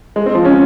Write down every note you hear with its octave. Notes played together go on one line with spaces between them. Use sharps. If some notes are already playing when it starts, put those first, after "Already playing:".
G#3
C4
F3
C#4